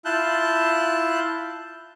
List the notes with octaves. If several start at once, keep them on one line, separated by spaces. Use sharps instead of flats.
E4 F4 A5 F#6 G6